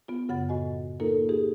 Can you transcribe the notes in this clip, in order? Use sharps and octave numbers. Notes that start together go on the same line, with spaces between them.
B3 F4
F#2 C#3 F#5 B5 A6
A2 F#4 D#5 G#5
A#3 D#4 F4 A4 A#4
D#4 G4 G#4